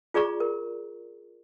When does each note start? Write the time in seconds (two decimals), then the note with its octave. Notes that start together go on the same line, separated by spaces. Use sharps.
0.14 F4 G#4 D5 A#5 C#6
0.40 A#4